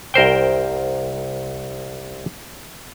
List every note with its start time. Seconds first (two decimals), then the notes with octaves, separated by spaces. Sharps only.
0.14 C2 A#4 C5 G5